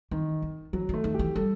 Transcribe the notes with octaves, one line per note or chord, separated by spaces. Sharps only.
D#3 E3
D#3
E3 F#3
D#3 A3
D#3
E3 G4
G3 A4